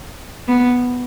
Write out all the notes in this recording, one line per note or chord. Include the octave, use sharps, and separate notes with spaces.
B3